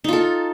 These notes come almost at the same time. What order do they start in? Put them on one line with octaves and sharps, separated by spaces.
D#4 F4 A4